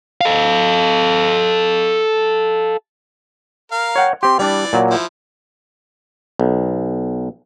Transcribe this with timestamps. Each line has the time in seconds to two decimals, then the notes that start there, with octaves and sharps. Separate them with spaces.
0.21 A4 F5
3.71 A#4 F5
3.96 C#5 F#5 G5
4.23 C4 G4 C6
4.39 E3 G3 D4 D5
4.73 A#2 F#3
4.90 F3 E4
6.39 B1